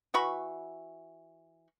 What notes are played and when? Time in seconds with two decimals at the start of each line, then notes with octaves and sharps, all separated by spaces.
0.14 E3 F#4 B5 C#6